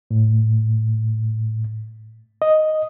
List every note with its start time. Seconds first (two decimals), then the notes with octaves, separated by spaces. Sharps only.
0.11 A2
2.42 D#5